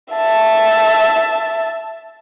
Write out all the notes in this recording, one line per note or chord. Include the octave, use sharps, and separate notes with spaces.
E5 A5